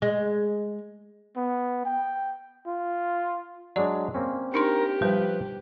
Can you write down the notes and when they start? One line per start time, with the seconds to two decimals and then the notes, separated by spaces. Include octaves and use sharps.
0.02 G#3
1.36 B3
1.85 G5
2.67 F4
3.76 F#3 G#3 D4 D5
4.14 A#3 C4 C#4
4.54 D4 D#4 G4 A#4 C6
5.02 F3 G3 B4 G5